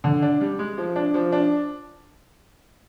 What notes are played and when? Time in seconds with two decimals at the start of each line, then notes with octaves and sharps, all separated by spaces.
0.04 D3
0.22 D4
0.41 G3
0.59 G#3
0.78 F3
0.96 D4
1.14 F3
1.32 D4